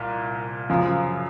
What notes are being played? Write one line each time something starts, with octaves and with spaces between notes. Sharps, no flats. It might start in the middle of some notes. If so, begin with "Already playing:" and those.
Already playing: C2 A#2
F#2 C#3 F3